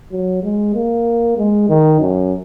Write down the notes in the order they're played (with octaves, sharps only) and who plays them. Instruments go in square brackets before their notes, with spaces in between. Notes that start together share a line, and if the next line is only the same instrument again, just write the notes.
[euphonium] F#3
G#3
A#3
G#3
D#3
F#2